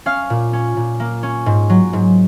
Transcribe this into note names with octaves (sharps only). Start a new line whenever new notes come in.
C#4 F5 F6
A#2
C#4
A#2
A#3
C#4
G#2
F#3
G#2